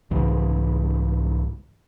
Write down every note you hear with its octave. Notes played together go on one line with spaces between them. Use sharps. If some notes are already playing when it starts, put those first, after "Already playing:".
C2 G#2 C#3 E3